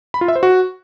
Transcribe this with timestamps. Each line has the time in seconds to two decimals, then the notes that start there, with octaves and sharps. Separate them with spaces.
0.14 B5
0.21 F4
0.28 E5
0.36 C5
0.43 F#4